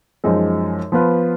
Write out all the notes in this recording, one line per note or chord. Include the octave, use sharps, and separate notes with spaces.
F#2 F3 G#3 D#4
F3 B3 F4 B4